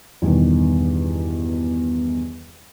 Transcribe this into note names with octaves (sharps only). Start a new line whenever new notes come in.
E2 G2 B2 D#3